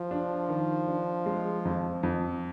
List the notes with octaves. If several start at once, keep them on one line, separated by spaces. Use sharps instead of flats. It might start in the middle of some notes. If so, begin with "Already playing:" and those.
Already playing: F3
D4
D#3
D4
G#3
F2
F2